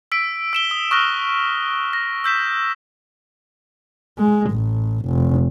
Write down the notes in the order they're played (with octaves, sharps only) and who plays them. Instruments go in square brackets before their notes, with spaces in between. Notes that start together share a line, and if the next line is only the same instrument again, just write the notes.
[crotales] E6 B6 D7
E6 E7 G7
D#6
C#6 D#6 F6 F#6 A#6 G7
A#6
E6 G6 B6 E7
[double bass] G#3
A1
F1